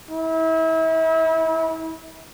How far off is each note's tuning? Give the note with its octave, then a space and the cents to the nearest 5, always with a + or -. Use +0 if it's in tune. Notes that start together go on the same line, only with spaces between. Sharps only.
E4 -35